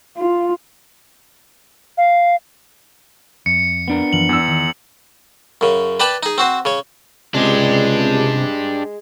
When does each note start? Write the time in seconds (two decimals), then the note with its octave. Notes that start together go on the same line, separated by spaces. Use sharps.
0.17 F4
1.98 F5
3.46 F2 C#7
3.88 B3 D4 A#4
4.13 F#2 E3 F3 F#7
4.29 E2 E6
4.48 D#3
5.61 F#2 C#3
6.00 B4 D5 G5 A5 B5
6.23 D#4 G#4
6.38 C4 F#4 C5
6.65 C#3 C#5
7.34 C#2 C3 G#3 D4 G4